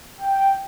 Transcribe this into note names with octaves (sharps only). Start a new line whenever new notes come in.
G5